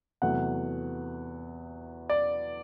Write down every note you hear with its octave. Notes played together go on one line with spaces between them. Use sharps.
E2 C3 F#3 A3 F#5
D5